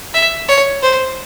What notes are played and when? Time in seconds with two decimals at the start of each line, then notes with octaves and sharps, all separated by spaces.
0.14 E5
0.49 C#5
0.83 C5